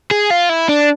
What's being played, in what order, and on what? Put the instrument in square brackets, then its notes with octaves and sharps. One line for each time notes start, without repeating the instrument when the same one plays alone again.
[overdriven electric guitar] G#4
F4
E4
D4